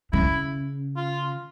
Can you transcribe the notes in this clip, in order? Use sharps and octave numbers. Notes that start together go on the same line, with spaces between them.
C#3 E4
F4